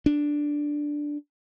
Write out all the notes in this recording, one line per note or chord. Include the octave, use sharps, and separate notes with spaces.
D4